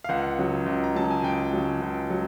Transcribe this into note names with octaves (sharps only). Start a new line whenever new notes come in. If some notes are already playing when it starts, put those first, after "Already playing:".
F5
C#2 F#5
C#3 F#3
C#2
A#5
C#3 F#3 A5
G#5
C#2 G5
C#3 F#3
C#2
F#3